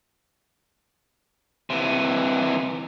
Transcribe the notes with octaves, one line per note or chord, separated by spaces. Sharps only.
C3 E3